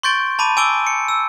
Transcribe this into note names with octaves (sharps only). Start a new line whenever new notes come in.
C6 C#6 G6 A6 D7 G7
A5 B5 D6 D#7
G#5 D6 E6 D7 G7
C#7
E6